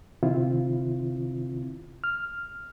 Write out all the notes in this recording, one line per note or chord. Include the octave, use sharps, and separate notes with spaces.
C3 D#3 C4 E4 F4
F6